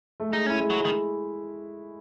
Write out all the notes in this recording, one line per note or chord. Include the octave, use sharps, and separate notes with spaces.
A3
G#3 D#4
A3
C#4 E4
G#3
F#3
G#3
D#3